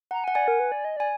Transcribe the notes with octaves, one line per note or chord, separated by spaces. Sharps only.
F#5 A#5
F#5 G#5
D5 G#5
A#4
B4
D5
D#5
D5 G#5